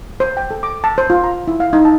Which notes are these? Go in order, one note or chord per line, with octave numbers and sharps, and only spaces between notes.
C5
G5
A4
D6
A5
C5
F4
A#5
E4
F5
D#4
A5